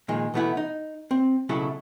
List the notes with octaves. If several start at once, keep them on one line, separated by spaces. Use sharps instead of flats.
A#2 D#3 F3 G#3
B2 E3 A3 B3 E4 F#5
D#4
C4
B1 C#3 F#3 A3 E4 A5